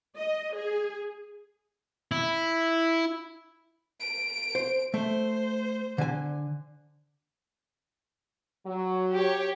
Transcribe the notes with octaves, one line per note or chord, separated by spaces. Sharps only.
D#5
G#4
E4
D7
C5
A3 C5
D3 G#5
F#3
G4 C#5